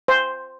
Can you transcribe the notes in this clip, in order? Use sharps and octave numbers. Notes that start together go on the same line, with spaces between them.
C5